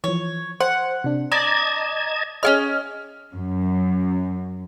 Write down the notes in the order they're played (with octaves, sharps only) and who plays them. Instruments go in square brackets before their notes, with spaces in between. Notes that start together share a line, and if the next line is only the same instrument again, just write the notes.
[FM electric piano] E3 F3 [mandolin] C#5
[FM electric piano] C5 [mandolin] F#5
[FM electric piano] C3 D4
[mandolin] D5 [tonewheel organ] D#5 A5 G#6 [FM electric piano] A#5
[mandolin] C#4 E4 F6 [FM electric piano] G#4 C#5 D#5
[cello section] F#2